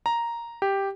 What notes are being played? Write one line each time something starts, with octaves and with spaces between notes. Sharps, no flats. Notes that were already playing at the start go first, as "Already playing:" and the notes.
A#5
G4